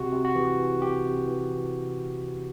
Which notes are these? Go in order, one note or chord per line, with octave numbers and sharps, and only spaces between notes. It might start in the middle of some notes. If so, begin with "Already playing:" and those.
Already playing: C3 F#4
C3
F#4
E3 G4
E3
C3 G4
C3
E3
E3